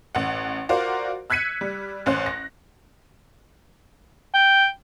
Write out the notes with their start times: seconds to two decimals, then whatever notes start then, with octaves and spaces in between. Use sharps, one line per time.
0.15 A1 F#5
0.69 F4 F#4 A#4 C5 D5
1.30 E6 F#6 G#6 B6 C#7 D#7
1.61 G3
2.06 A1 C#4 C5 F#6
2.26 A#6
4.34 G5